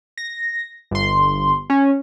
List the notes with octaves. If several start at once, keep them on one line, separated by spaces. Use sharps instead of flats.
A#6
G1 C6
C#4